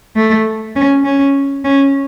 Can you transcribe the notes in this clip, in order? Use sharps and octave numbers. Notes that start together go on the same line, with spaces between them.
A3
C#4
C#4
C#4